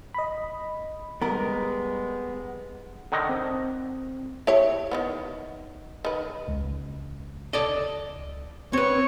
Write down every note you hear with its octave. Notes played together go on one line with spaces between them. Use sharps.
D#5 B5
G3 G#3 B3 A#4
D3 D#3 D#5
C4
E4 G4 C#5
D#3 F#3 B3
D#3 B4
C#2
A4 D5 D#5
C4 B4 C#5